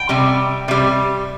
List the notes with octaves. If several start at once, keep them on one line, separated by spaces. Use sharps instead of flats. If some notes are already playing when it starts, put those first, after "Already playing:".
Already playing: G5
C3 G3
C3 G3